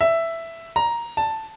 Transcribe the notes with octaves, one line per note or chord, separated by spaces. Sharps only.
E5
A#5
A5